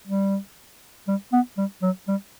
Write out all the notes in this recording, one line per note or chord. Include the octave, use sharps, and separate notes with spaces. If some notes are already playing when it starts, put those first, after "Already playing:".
G3
G3
B3
G3
F#3
G3